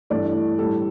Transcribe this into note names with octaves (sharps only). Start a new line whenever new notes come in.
G2 E3 A3 D5
A2 G3 A4